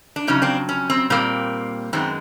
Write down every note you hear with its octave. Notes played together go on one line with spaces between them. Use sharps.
D4
F2 C#3 F#3 C#4 D#4
C4 D4
C#4
C4
A#2 G3 A#3 C4
F#2 D#3 G#3 B3 C4